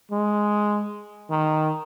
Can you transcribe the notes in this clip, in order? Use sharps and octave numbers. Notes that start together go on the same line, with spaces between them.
G#3
D#3